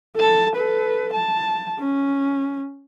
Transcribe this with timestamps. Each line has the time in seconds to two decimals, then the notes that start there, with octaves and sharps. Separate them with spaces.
0.16 A4 A5
0.56 A4 B4
1.13 A5
1.79 C#4